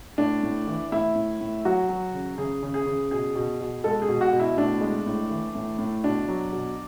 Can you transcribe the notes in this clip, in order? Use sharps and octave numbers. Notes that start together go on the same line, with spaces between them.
A2 D4
A2
E3
A2 E4
A2
A2
F#3 F#4
F#3
C#3
C#3 G#4
C#3
G#4
C#3
B2 G#4
B2
B2
G#3 A4
G#4
B2
F#4
B2
E4
A2 D4
G#3
A2
E3
A2
A2
B2 D4
F#3
B2